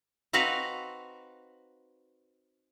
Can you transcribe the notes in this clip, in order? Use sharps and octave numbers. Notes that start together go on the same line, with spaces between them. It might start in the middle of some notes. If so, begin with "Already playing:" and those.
C4 D#4 F#4 B4 F5